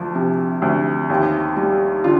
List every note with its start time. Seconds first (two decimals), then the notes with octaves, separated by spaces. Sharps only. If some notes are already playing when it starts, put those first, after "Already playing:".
Already playing: D2 F3
0.15 C3
0.62 D2
1.10 D#2
1.56 G3
2.04 D3 F4